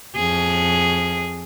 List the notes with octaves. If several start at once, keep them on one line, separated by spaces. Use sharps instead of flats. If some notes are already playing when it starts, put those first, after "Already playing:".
F2 G#4